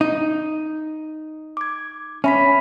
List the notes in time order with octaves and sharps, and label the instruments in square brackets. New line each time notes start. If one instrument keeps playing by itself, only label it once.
[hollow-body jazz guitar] D#4
[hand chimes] D6 G#6
[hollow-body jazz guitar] C#4 [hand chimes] E5 B5 B6